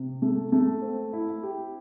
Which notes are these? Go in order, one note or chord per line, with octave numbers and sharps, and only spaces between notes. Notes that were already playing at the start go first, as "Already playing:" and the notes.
Already playing: C3
A3
A3
C4
E4
G4